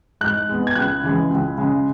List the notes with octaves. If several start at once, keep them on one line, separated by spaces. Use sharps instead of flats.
G#2 F#6
G#3 B3
G#6
C#2 F#6
C#3 E3 G#3
C#2
C#3 G#3